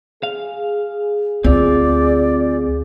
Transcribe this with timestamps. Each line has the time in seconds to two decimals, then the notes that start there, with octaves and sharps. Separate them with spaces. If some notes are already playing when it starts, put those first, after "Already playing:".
0.23 G#4 F5
1.44 D2 C4 F4 D5